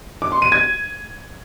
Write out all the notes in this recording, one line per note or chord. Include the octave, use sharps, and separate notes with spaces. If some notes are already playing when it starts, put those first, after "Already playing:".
D6
C6
D#7
G#6